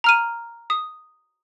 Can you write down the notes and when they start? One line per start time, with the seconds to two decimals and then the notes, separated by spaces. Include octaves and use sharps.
0.04 A#5 F6 D#7
0.70 D#6